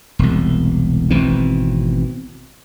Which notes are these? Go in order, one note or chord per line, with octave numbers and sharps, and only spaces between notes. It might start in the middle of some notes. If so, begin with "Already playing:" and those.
E1 C2
G#1 B2 E3 C4